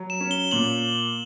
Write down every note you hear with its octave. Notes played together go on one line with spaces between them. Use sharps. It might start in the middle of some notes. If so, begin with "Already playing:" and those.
Already playing: F#3
E7
C#4
G7
A#2 F#7